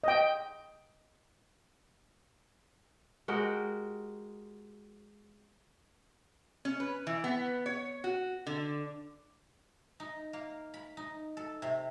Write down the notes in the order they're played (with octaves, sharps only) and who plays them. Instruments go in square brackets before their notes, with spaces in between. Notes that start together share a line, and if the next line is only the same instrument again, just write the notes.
[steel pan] D#5 G5
[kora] G#3 F#4 G4 A#4
[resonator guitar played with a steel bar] C#4
B4
E3
B3
C#5
F#4
D3
[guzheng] D#4
A#3
B5
D#4
A4
C3